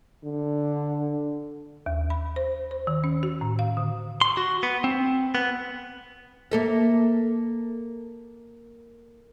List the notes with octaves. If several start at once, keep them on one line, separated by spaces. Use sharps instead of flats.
D3
D#2
B5
C5
C5
D#3
C#4
F#4
A2
F5
D3
C6
F#4
B3
C4
B3
A#3 A4 E5